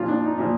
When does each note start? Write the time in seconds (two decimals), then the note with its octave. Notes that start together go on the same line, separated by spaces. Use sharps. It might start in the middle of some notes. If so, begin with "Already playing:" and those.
Already playing: A#2 F3 F4
0.08 D4
0.23 D#4
0.38 A#2 F3